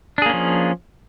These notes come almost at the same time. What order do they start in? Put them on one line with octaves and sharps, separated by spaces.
D4 G#4 A#3 C#4 F3